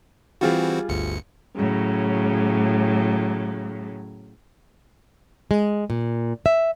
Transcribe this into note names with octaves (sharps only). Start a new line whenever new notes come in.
E3 G3 C4 F4 F#4 G#4
G1 D2 C#7
A2 C#3 F#3
G#3
A#2
E5